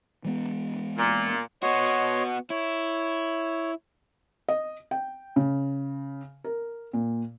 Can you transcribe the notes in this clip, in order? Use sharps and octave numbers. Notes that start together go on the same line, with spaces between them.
E3 G#3 B3
A#2
B3 F#4 C#5 D#5 C6
E4 C#5
D#5
G5
C#3
A#4
A#2